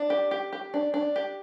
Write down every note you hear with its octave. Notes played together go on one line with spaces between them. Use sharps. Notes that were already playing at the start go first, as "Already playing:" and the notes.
Already playing: D4
G4
G4
G4
D4
D4
G4